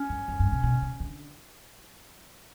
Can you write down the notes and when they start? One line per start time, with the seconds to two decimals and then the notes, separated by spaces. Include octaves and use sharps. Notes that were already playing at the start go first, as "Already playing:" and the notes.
Already playing: C#4
0.10 F#2
0.28 F#2
0.40 G2
0.52 B2
0.64 B2
0.82 C#3
1.00 D3